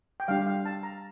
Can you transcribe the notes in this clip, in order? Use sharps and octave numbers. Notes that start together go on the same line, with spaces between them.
G5
G3 D4 G4 F5
F5
A5
A#5